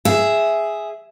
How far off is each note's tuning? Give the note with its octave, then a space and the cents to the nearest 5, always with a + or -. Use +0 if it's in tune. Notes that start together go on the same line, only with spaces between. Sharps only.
G#4 +0 E5 +0